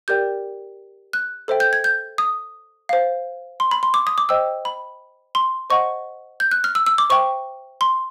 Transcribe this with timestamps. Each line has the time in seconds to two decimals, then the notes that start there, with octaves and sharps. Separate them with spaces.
0.08 G4 A#4 D5 G5 G6
1.13 F#6
1.48 A4 C5 E5 G5
1.60 G6
1.73 G#6
1.84 G6
2.18 D#6
2.89 C5 F5
3.60 C6
3.71 B5
3.83 C6
3.94 D6
4.07 D#6
4.18 D6
4.29 C5 D#5 G5 E6
4.65 B5
5.35 C6
5.70 C5 D#5 F#5 C#6
6.40 G6
6.51 F#6
6.64 F6
6.75 E6
6.86 E6
6.98 D6
7.10 C5 E5 G5 C#6
7.81 C6